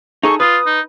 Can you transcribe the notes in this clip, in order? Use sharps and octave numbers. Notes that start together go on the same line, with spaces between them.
D#4 G#4 A4 C#6
F4 B4 D#6
D#4